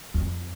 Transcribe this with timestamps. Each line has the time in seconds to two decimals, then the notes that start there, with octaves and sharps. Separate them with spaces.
0.14 F2